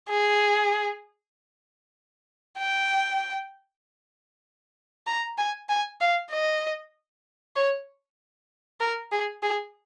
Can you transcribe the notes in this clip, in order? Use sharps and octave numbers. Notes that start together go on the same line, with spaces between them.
G#4
G5
A#5
G#5
G#5
F5
D#5
C#5
A#4
G#4
G#4